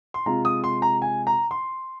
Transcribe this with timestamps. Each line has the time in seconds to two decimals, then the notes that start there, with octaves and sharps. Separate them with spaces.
0.14 C6
0.26 C3 G#3 F4 A#5
0.45 D#6
0.64 C6
0.82 A#5
1.02 G#5
1.27 A#5
1.51 C6